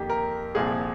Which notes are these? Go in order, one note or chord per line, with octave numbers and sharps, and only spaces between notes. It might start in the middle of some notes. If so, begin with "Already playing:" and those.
Already playing: F2 D#3 A#3 G4
A#4
C2 A#2 F3 C4 G#4